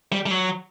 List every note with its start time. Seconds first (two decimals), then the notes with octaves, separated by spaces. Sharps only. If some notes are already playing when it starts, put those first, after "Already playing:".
0.12 G3
0.26 G3
0.31 F#3